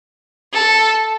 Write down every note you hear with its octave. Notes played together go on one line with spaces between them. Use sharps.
A4